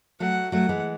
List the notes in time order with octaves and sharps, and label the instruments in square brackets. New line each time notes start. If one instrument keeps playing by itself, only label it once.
[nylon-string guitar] F#3 A3 [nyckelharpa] F#5
[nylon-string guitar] F#3 A3 [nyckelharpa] F#5
[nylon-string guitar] E3 G#3